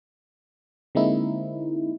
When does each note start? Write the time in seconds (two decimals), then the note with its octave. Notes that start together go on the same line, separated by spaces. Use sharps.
0.95 D3 G#3 A#3 C4 D#4 E4